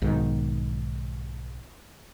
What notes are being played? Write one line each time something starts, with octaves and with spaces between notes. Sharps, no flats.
B1 G#2 D#3